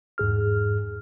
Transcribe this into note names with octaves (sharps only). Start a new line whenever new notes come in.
E2 G#2 G#4 F6